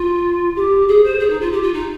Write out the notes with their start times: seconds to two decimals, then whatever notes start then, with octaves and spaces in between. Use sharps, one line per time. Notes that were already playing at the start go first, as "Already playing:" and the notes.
Already playing: F4
0.56 G4
0.88 G#4
1.04 C5
1.19 G#4
1.29 D#4
1.41 F4
1.52 G4
1.62 F4
1.73 D#4